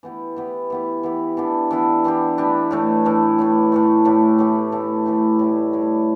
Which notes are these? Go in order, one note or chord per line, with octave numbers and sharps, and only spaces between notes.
E3 B3 G4
E3 B3 G4
E3 B3 G4
E3 B3 G4
E3 B3 D4 G4
E3 B3 D4 G4
E3 B3 D4 G4
E3 B3 D4 G4
A2 E3 A3
A2 E3 A3
A2 E3 A3
A2 E3 A3
A2 E3 A3 G4
A2 E3 A3 G4
A2 E3 A3 G4
A2 E3 A3 G4
A2 G3 E4
A2 G3 E4